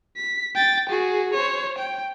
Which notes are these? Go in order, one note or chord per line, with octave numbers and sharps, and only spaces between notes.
B6
G5 A6
F#4 G#4
C5 C#5
G5